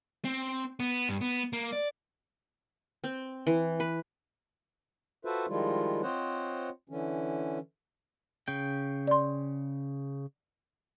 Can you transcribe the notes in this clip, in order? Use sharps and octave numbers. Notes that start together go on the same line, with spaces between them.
C4
B3
G2
B3
A#3
D5
C4
E3
B4
F4 F#4 A4 B4 C5 E5
D#3 F3 G3 G#3 E4 F4
C4 F4 C5 C#5 D#5 F#5
D3 E3 C#4
C#3 G5
D5 C6